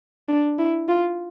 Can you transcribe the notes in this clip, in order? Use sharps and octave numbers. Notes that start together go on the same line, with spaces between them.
D4
E4
F4